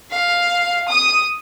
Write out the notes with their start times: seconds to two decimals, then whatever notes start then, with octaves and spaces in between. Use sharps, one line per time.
0.11 F5
0.88 D#6